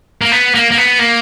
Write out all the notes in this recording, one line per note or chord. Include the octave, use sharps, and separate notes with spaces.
A#3
B3
A#3
A#3
B3
A#3